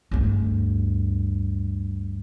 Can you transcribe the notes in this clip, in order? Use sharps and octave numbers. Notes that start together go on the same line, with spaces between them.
D2 G2